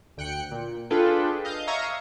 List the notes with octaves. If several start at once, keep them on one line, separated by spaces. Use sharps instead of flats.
D2 G5 F#6 C#7
A#2
D4 F4 G#4 A4 B4 G5
D#5 F5 G6
C#5 E5 F5 A#5 C#6 D#6